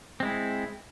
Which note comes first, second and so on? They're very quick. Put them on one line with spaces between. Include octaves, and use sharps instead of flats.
C4 G#3 E4